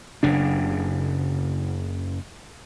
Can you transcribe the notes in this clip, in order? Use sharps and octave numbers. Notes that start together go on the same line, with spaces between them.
F#1 C#3 D4